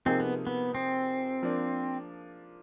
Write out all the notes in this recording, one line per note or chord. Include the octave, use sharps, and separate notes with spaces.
C3 F3 A#3 C4 D#4 G#4
B3
B3
C4
F3 A#3 D4